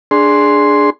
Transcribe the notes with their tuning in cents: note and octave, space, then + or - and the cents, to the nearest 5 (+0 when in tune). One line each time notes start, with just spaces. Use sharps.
D4 +0 G#4 +0 C6 +0